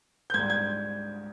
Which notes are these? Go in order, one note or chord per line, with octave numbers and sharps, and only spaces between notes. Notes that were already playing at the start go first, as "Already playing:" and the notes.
G6
G#2 G3 G#6
G#6